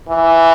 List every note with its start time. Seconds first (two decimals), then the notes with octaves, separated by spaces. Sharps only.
0.09 E3